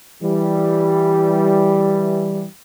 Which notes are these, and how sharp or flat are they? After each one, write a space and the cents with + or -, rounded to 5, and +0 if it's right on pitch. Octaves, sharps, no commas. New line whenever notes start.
E3 +0 G3 +0